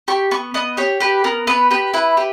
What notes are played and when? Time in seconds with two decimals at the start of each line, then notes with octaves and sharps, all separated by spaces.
0.08 G4 C#6
0.31 B3 C#6
0.54 B3 D#5
0.77 G4 C#5
1.00 G4 B4
1.24 B3 A#4
1.47 B3 B4
1.71 G4 B4
1.94 E4 B4
2.17 G4